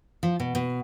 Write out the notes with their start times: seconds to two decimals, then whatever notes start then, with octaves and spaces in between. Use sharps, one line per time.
0.23 F3
0.40 B2
0.55 B2